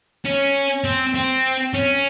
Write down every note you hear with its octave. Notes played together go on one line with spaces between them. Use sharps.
C#4
C4
C4
C#4